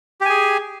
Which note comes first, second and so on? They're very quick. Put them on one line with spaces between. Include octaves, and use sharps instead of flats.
G4 G#5 G#4